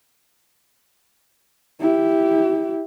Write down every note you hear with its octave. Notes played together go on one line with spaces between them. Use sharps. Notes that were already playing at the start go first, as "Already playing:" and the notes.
E4 G4